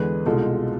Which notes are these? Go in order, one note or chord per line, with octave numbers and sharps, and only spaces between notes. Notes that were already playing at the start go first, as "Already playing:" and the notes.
Already playing: E2 D3 G#3 G#4 B4
C2 B2 G#3 F4 A4